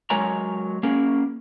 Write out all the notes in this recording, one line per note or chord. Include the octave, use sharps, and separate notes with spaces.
F#3 G#3 A#4 C#5 G#5 A#5
A#3 C#4 G#4 A#4